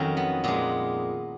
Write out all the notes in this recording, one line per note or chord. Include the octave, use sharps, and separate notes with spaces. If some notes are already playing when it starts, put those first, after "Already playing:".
Already playing: F2 D#3 F#3 C#4
B3
A#2 G#3 B3